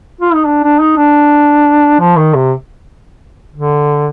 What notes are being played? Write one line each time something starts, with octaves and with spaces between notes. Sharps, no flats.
F4
D#4
D4
D4
D#4
D4
F3
D#3
C3
D3